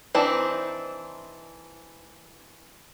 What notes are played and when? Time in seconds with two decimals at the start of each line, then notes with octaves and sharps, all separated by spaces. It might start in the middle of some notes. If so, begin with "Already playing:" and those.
0.15 E3 C4 D4 D#4